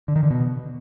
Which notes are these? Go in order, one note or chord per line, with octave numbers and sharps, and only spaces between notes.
D3
D#3
D3
B2